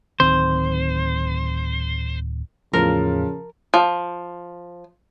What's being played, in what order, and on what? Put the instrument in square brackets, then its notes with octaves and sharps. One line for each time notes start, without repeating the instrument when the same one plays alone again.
[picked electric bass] D1 D#3 C4 [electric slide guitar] C5
[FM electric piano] E2 A2 E3 [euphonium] C#3 [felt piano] F3 [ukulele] A#4
[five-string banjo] F3